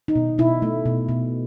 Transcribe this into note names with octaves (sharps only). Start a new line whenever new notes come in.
D#4
B2
B2 E4
A3
B2
B2